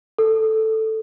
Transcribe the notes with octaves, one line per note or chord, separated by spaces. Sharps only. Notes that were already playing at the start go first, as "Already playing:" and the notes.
A4